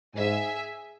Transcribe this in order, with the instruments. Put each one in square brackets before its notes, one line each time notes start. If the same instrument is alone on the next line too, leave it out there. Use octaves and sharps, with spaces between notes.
[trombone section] G#2 [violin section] G#4 E5 G#5